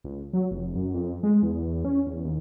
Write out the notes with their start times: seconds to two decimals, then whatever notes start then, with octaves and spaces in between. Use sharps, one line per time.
0.04 C#2
0.33 F#3
0.51 F1
0.75 F#2
0.94 F2
1.23 G#3
1.43 E2
1.67 E2
1.85 C#4
2.07 E2
2.24 D#2